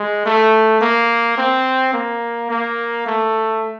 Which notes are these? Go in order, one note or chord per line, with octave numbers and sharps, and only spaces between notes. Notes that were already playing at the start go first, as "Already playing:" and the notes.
Already playing: G#3
A3
A#3
C4
A#3
A#3
A3